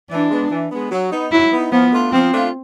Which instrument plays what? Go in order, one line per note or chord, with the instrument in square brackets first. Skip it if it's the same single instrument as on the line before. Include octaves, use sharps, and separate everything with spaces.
[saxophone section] E3 [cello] D4
[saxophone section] G#3 B3
E3
G#3 B3
F#3
B3 D#4
[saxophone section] F#3 [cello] E4
[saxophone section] B3 D#4
[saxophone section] F3 [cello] B3
[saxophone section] A3 D4 F4
[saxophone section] F3 [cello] C4
[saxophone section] A3 D4 F4